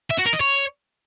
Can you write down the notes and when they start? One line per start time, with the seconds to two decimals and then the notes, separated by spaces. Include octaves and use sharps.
0.10 E5
0.18 F#4
0.25 A#4
0.33 D#5
0.41 C#5